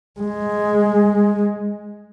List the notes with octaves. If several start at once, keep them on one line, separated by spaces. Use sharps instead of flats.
G#3